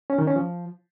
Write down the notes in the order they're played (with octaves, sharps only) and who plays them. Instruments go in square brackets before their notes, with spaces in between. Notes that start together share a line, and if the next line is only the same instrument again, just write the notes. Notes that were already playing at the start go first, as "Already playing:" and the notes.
[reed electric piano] C#4
D#3
C#4
F3